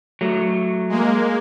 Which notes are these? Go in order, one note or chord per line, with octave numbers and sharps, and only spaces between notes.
F#3 A3
G#3 A#3